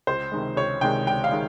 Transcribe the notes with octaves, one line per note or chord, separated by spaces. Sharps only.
C#2 C5
C3 D#3 G#3
C#2 C#5
C3 D#3 G#3 G5
C#2 G5
F5
D#3 G#3